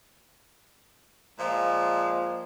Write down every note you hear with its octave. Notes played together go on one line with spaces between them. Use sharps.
A#2 F3 G#3